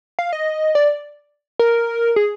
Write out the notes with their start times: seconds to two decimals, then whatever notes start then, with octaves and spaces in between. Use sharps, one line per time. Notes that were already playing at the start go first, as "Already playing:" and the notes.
0.19 F5
0.33 D#5
0.75 D5
1.59 A#4
2.16 G#4